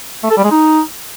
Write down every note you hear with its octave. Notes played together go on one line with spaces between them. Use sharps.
A3
A4
G3
G#3
D#4